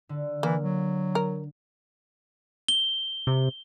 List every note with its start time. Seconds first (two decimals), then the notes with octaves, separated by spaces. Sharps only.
0.09 D3
0.43 E3 A#3
0.62 F#3
1.15 A#4
2.68 G7
3.27 C3